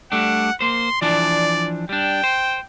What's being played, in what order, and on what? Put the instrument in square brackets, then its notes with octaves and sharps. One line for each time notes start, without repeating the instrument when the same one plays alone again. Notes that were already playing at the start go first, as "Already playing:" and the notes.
[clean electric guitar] G3 A3 D4 [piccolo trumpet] F#5
[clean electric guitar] A#3 C5 [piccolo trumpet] C6
[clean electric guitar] E3 F3 D4 [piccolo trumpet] D5
[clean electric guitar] G3 D4 [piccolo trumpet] G5
[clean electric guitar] C5